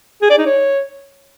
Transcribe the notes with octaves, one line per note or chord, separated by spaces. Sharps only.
G#4
D5
D#4
C#5